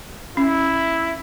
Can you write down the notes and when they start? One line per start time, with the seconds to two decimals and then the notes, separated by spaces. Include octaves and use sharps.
0.37 C#4 E4